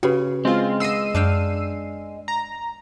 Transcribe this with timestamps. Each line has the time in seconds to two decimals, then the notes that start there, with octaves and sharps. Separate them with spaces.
0.03 C#3 F#4 G4 B4
0.45 G#3 C4 F4
0.80 B3 D#5 E6 C7 D#7
1.15 F#2 D4 F5 G5
2.28 A#5